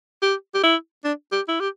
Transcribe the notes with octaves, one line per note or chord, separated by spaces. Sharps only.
G4
G4
E4
D4
G4
E4
G4